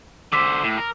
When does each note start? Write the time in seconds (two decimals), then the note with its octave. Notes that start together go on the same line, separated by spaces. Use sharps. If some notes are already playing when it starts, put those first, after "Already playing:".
0.32 D3 C5 D6 E6 B6
0.64 A2
0.78 A#4